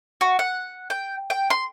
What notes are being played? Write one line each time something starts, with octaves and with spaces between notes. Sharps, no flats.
F#4
F#5
G5
G5
C6